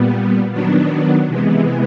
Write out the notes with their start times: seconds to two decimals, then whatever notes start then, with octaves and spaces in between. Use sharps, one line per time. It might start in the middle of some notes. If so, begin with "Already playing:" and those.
Already playing: A#2 G3 B3
0.52 D#3 F#3 B3 D4
1.28 C3 E3 G#3 B3